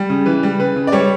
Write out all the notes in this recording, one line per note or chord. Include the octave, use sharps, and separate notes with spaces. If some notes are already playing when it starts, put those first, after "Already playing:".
Already playing: G3
C#3
E3 B4
G3
C#3 B4
C#3
D5
G3 C#5